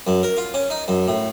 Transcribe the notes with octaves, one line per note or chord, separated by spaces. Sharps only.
F#2
A#4
F4
C#4
D#4
F#2
A2